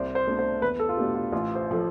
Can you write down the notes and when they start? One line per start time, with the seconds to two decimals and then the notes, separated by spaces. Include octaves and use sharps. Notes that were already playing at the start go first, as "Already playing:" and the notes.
Already playing: C2 C5 D5
0.15 C5
0.27 B2 A3 D4
0.39 C5
0.62 E2 B4
0.79 A4
0.89 F4
0.97 B2 A3 D4 G4
1.15 F4
1.32 A1 F4
1.55 C5
1.71 F3 A4